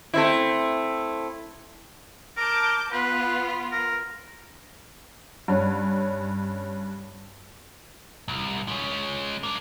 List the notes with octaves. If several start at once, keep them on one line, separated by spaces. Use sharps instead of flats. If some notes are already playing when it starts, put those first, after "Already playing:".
A3 C4 E4
A#4 A5 D6 G6
B3 F4 B4
A#4
G2 C#4
C2
G#3 C#4
A#3 D4